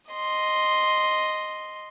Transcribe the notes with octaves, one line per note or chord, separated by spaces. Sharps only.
D#5 C6